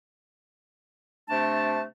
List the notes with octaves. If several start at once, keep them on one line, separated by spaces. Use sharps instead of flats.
C3 A3 D4 A5